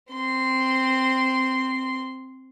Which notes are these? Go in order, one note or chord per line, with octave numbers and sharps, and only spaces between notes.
C4 C6